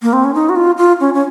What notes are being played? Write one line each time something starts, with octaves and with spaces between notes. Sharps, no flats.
A#3
C4
C#4
D#4
F#4
F4
F4
C#4
C#4